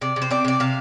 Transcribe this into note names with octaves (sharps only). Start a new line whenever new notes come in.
C3 D5
C3
C5
C4 D5
C3 D5
C3 F5